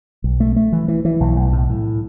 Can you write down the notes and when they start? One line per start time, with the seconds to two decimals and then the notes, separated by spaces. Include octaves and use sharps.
0.24 B1
0.40 A3
0.56 A3
0.73 E3
0.88 E3
1.05 E3
1.20 B1
1.37 B1
1.53 A2
1.70 A2